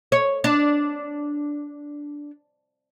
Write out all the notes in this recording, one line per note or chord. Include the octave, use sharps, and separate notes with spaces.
C#5
D4